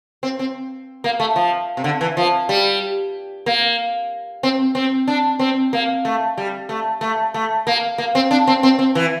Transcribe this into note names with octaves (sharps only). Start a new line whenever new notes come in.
C4
C4
A#3
A3
F3
C3
D3
E3
F3
G3
A#3
C4
C4
D4
C4
A#3
A3
G3
A3
A3
A3
A#3
A#3
C4
D4
C4
C4
C4
E3